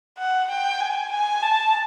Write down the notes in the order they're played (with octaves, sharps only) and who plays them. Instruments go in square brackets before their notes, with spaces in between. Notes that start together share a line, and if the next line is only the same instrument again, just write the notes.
[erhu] F#5
G5
G#5
G#5
A5